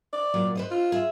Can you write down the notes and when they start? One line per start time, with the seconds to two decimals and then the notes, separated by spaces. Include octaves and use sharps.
0.13 D5
0.34 A#2 F#3 A#3
0.55 B4 C5 D#5
0.71 F4
0.92 G#4 E5